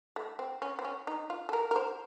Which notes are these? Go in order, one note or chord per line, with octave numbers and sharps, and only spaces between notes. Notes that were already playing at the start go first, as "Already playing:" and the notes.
A3
C4
C#4
C4
C#4
D#4
F4
A4
A#4
A#4
C5